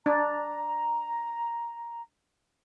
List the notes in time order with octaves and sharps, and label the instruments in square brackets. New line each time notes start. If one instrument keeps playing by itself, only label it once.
[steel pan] D4 [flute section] A#5